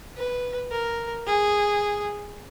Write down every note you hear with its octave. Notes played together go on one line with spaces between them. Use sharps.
B4
A#4
G#4